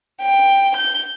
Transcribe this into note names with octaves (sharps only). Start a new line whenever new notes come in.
G5
G6